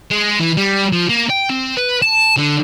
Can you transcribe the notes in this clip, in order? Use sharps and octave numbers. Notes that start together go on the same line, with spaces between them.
G#3
E3
G3
F3
A#3
G5
C4
B4
A5
D3